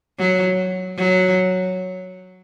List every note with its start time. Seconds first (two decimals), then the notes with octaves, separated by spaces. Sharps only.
0.19 F#3
0.97 F#3